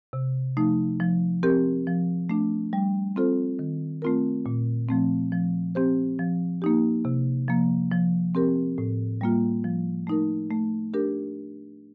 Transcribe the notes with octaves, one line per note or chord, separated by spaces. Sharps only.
C3
F3 A3 D#4
F3
C4 G4 A#4
F3
A3 D4
G3
C4 F4 A4 C5
D#3
A3 C4 F4 A#4
A#2
F3 A3 C4
F3
C4 G4 C5
F3
A#3 D#4 G4
C3
F3 A#3
F3
C4 G4 A#4
A2
G3 A#3 F4
F3
A3 D#4 A#4
A3
D4 G4 A#4